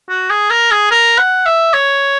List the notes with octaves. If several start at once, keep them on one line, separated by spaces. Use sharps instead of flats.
F#4
G#4
A#4
G#4
A#4
F#5
E5
C#5